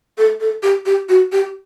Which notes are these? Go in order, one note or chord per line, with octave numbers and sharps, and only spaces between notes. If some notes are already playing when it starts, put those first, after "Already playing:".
A4
A4
G4
G4
F#4
G4